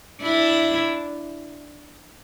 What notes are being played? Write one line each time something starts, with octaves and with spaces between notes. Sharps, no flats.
D4 E4